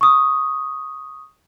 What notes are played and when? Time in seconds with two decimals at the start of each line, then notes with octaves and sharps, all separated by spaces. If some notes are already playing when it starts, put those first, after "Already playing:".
0.01 C#6 D#6